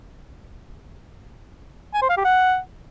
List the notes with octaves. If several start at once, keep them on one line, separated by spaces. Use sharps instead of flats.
G#5
C5
F5
G4
F#5